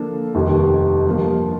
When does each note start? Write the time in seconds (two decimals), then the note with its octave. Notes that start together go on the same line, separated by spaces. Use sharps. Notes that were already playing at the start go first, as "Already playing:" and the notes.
Already playing: D3 F3 A#3 D4 A4
0.35 F1 D#2 D#3 G3
1.06 G2 F3 A#3